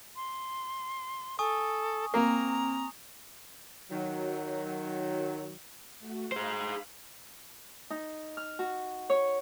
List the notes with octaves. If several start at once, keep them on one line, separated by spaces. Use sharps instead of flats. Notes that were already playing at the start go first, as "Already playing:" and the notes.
C6
A4 G#5 C#6 D#6
A#3 C4 A#5
D#3 F#3
A3 F#4
G#4 C5 F5 B5
D#4
F6
F#4
C#5